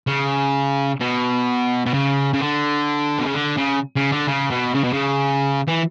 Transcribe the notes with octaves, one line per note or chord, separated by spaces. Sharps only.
C#3
B2
B2
C#3
C#3
D3
B2
C#3
D3
C#3
C#3
D3
C#3
B2
C#3
B2
C#3
E3